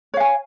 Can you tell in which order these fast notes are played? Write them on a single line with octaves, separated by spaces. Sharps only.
C#5 F5 G#5